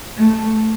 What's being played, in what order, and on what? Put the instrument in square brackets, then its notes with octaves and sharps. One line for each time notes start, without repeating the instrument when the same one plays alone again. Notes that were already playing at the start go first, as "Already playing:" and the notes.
[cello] A3